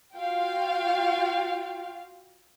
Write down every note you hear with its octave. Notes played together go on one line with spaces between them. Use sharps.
F4 F#4 F5 G5